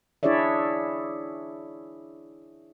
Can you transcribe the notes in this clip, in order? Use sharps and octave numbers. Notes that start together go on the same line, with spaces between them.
D4 E4 G#4 C#5 D5 E5